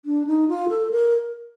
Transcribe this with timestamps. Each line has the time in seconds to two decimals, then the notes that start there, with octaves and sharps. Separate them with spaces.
0.05 D4
0.27 D#4
0.48 F4
0.69 A4
0.91 A#4